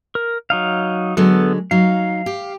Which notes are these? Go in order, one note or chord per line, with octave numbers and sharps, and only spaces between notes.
A#4
F#3 D#4 F5
D3 F#3 G#3 B3 A4
F#3 D#4 F5
G4